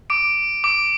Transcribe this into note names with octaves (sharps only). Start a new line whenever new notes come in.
D6 D7
D6 D7